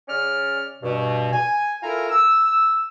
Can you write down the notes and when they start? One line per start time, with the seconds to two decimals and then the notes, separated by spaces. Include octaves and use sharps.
0.08 C#3 C#4 D5 F6
0.83 G2 B2
1.32 G#5
1.82 E4 F4 A4 A#4 G#5 A#5
2.10 E6